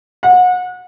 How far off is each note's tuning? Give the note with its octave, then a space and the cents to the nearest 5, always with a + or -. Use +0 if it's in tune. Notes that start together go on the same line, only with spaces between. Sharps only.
F#5 -30